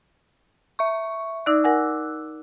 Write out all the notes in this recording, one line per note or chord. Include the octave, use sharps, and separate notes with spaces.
E5 C#6
D#4 D5 D6 E6 F#6
A#4 F#5 G#5